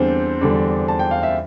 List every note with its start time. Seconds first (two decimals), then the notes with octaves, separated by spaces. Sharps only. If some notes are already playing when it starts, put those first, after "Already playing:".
Already playing: E2 D3 G3 C4 D4 C5
0.41 E2 D3 G3 D4
0.88 A5
0.99 G5
1.11 F5
1.23 E5